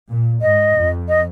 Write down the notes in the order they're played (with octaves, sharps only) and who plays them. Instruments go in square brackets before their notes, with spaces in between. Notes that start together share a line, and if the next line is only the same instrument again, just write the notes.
[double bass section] A#2
[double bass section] G#2 [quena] D#5
[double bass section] F2
[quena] D#5